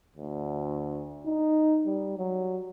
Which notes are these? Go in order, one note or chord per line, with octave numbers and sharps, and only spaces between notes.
D2
D#4
G3
F#3